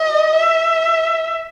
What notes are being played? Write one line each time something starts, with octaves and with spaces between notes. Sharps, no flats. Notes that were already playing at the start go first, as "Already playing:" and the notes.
Already playing: D#5
E5